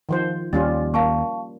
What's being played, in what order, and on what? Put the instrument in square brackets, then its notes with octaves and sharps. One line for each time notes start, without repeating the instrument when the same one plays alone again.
[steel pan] D#3 F3 C5
[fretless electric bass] D#2 [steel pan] G3 C#4 F4 [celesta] A6
[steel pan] A#3 [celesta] F5 A5 C#6